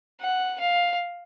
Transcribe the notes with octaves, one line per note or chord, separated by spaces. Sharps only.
F#5
F5